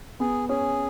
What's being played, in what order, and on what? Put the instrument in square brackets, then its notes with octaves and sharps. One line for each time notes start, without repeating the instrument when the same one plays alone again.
[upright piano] B3 [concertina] G#4
[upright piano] C#4 [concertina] G#4